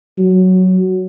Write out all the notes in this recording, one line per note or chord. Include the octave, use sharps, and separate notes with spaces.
F#3